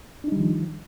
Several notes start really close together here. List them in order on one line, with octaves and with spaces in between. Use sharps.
D4 D#4 G3 D#3 F3